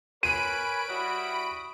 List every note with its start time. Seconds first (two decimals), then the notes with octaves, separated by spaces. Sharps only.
0.23 A#4 B4 C#5 G#5 B5 F#6 D7 D#7
0.89 G3 E4 F#4 D#6